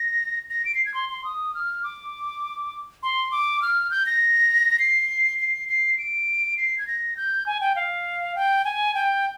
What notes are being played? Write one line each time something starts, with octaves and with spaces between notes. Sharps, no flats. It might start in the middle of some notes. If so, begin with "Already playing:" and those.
Already playing: A#6
A#6
D7
C7
G#6
C6
C6
D#6
F6
D6
C6
D6
F6
G6
A#6
C7
C7
C7
D7
C7
G#6
A#6
G6
G#5
G5
F5
G5
G#5
G5